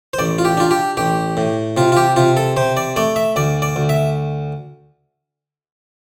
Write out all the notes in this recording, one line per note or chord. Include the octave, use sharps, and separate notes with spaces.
C5
A1 D5
F4
G4
D4 F4
G4
A1 G4
A2
C3 F4
F4
G4
C3 F4
A4
C3 C5
D5
A3 D5
E5
D2 D5
D5
D2
E5